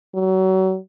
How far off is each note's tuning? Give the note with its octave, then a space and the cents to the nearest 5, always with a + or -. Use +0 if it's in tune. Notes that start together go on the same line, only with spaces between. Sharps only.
F#3 +30